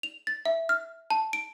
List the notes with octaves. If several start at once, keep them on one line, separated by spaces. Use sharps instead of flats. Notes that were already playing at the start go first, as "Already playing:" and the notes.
F7
A6
E5
F6
A5
D7